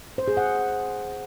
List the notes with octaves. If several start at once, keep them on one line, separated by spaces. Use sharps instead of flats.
C5
G#4
F#5